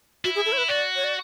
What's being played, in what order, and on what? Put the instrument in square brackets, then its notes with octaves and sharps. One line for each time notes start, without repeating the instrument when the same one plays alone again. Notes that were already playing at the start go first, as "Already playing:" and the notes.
[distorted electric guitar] E4 [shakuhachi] F#4
[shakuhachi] G#4
A4
C#5
B4
[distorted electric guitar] F#4 [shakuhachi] D5
[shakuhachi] C#5
D5